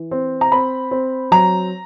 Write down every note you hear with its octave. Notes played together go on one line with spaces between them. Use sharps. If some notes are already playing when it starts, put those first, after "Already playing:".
Already playing: E3
C4
A#5
C4 B5
C4
F#3 A#5